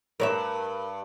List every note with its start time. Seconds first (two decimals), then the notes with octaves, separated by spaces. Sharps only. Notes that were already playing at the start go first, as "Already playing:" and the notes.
0.20 G2 A#4 C#5 E5